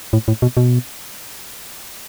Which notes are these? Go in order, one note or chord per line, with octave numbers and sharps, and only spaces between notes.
A2
A2
B2
B2